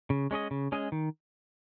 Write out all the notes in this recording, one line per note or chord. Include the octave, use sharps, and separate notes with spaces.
C#3
G#3 C#4 G#4 D#5
C#3
G#3 C#4 G#4 D#5
D#3